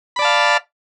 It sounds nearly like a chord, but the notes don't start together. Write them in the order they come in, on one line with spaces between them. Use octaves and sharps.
B5 D5 A5 F5